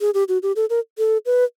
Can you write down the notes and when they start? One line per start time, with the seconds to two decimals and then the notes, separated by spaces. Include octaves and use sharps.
0.01 G#4
0.14 G4
0.28 F#4
0.43 G4
0.56 A4
0.70 A#4
0.98 A4
1.26 B4